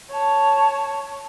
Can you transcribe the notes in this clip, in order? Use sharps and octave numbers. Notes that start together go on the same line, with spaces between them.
C#5 A5